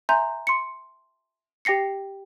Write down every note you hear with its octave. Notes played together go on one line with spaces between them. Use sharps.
E5 G#5 A#5 C6 G6
C6 C#7
G4 G5 A#6 C7 C#7